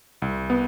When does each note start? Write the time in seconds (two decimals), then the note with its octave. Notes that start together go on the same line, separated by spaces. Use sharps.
0.22 C2
0.50 B3